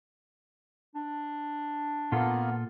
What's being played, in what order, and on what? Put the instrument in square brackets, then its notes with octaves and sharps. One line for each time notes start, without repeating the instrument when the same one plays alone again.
[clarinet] D4
[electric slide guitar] A#2 F4 A4 [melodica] A#3 B3